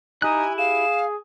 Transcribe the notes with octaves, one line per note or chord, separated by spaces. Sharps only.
D#4 E4 G4 D#5 G#5 F#6
G#4 F5 E7